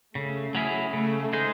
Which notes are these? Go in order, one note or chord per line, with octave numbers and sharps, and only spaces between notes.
C#3 A3
F#3 C#4 E4 G#4
C#3 A3
G#3 D#4 G#4 C5